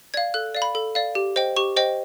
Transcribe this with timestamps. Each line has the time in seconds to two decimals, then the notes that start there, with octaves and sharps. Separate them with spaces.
0.14 D5 F5 G#6
0.34 A4 F#6
0.55 D5 F5
0.62 B5
0.75 A4
0.95 D5 F5
1.15 G4
1.36 C5 D#5 G5
1.57 G4 C#6
1.76 C5 D#5 G5